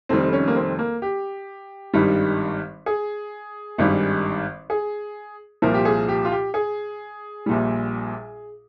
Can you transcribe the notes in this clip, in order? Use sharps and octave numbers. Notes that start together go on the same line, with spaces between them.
F1 F2 D#3 G3 C4
C#4
A#3
C4
A#3
G4
G#1 G2 D#3 G3
G#4
G#1 G2 D#3 G3
G#4
C2 A#2 F3 A#4
G4
G#4
G4
F4
G4
G#4
A#1 A#2 G3